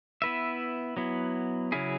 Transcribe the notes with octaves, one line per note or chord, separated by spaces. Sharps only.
B3 E4 B4 E5
F#3 B3 E4
C#3 F#3 C#4 E4 G#4